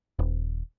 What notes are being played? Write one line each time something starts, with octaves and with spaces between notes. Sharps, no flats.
D#1